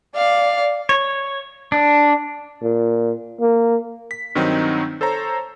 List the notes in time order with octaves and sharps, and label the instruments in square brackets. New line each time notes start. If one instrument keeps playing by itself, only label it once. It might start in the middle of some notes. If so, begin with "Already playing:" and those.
[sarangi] D5 [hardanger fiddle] F5
[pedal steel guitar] C#5
D4
[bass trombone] A#2
A#3
[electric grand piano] B6
G2 D#3 F#3 C4 D#4
A4 C5 C#5 A#5